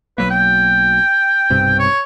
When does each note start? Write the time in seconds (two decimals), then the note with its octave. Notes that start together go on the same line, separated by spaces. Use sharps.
0.18 B1 F#3 A#3 B4
0.30 G5
1.50 B1 G2 C3
1.79 C#5